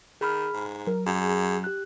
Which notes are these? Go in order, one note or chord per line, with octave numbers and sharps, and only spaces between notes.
D#3 G#4 B5 F6
G#2
F#3 A#4
F#2 G#4
G4 F#6